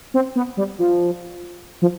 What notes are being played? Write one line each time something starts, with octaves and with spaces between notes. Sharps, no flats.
C4
B3
G3
F3
F3